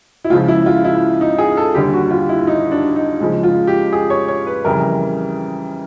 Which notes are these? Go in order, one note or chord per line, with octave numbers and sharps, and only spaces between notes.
E4
C#2 C#3 F3 F4
E4
F4
E4
D#4
G#4
A4
D#2 D3 G3 G4
F#4
F4
E4
D#4
D4
D#4
C#2 C#3 F3 G#3
F4
G4
G#4
C#5
C#5
B4
F2 C#3 E3 G3 A#4